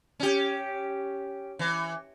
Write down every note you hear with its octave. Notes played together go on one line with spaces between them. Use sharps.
C#4 G4
E3